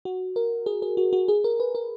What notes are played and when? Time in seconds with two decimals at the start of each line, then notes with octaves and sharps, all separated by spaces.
0.05 F#4
0.36 A#4
0.66 G#4
0.82 G#4
0.97 F#4
1.13 F#4
1.28 G#4
1.44 A#4
1.60 B4
1.75 A#4